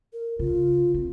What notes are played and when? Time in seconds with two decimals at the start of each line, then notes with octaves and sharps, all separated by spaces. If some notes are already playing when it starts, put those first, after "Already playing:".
0.13 A#4
0.39 C#3 F4
0.94 C4